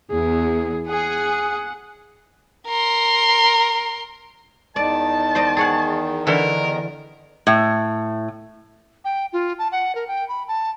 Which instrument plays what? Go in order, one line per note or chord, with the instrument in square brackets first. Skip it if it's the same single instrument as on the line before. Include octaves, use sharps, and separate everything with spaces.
[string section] E2 [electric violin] G#4
[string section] G#4 [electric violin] F#5
[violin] A#4 C6
[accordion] E2 D#3 [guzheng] D5 [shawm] A5
[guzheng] C5 D5 D#5
G#4 C#5 F#5
[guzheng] D3 E3 [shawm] A#4
[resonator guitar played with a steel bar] A2
[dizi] G5
F4
A5
F#5
A#4
G5
B5
A5